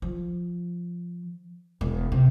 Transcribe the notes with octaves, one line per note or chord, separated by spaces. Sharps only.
F3
E1
C3